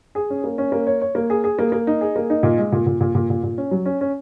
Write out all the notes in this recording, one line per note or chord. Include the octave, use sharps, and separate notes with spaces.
G#4
C#4
A#3
C#4
A#3
C#5
C#5
A#3
G#4
G#4
A#3
A#3
D#4
G#4
A#3
D#4
A#2
G#3
A#2
A#2
A#2
A#2
A#2
A#2
C#4
F#3
C#4
C#4